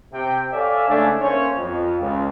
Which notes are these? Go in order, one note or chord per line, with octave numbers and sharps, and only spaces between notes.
C3 G5
A4 C#5 D5 E5 F5 G#5
G#2 C#3 A3 D4 E5 G#5
A#3 C#4 C5 C#5
F2
C#2